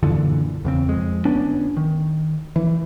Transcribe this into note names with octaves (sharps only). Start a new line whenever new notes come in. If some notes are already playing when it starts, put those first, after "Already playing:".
F#2 A#2 D3 E3
E2 C#3 C4
F2 G#3
G1 B3 C#4 D4
D#3
E3